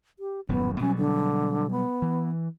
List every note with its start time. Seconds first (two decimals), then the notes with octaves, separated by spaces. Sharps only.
0.19 G4
0.49 D#1 F#2 A2 B3
0.80 B2 F#3 G3 C#4
0.98 D3
1.71 B3
2.02 E3